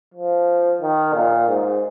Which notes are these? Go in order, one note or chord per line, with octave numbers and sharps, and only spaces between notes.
F3
D#3
A#2
G#2